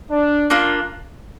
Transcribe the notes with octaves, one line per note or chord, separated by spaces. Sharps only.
D4
A#3 D4 F4